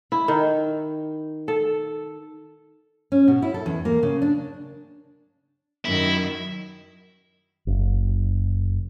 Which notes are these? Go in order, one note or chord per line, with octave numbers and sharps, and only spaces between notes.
E4
D#3
A4
C#4
B2
E4
A4
E2
A#3
C#3
D4
F#2 D#3 E4
F#1